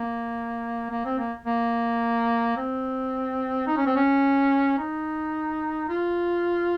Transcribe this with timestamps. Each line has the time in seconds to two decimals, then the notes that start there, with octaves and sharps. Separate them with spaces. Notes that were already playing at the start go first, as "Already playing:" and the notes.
Already playing: A#3
0.90 A#3
1.05 C4
1.18 A#3
1.46 A#3
2.57 C4
3.67 D#4
3.77 C#4
3.87 C4
3.96 C#4
4.78 D#4
5.89 F4